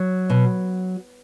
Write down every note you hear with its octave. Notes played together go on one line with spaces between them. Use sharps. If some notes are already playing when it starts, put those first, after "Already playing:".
Already playing: F#3
B2